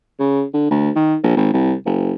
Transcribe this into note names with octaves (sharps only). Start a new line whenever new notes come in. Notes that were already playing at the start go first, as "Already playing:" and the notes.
C#3
D3
D2
D#3
A#1
G#1
C2
F#1